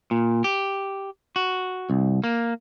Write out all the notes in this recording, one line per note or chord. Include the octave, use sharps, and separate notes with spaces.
A#2
G4
F#4
C2
A#3